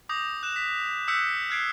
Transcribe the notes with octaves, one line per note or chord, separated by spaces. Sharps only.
D6 D#6 G6 A#6 F7
F#6 E7
B6
D#6 E6 F#6 G6 B6 C#7
F6 F#6 G#6 C7 D7